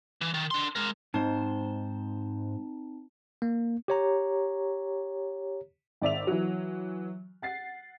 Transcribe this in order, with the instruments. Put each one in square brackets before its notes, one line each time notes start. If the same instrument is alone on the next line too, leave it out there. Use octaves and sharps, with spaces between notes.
[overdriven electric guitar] E3
D#3
D4 C6
G#3 A#4
[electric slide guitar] G#2 G#3 C5 [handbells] C4 D#4 A5
[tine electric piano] A#3
G4 C#5 A#5
[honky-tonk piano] G#1 D5 E5 F7
E3 F#3
F#5 A6 C7